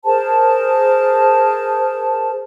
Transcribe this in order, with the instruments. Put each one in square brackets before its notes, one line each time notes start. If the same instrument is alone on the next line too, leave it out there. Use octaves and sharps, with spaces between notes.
[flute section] G#4 A#4 C5 A5